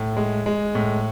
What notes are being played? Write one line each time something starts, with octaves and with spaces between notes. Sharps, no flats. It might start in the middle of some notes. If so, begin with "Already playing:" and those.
Already playing: A2
G#3
G#3
A2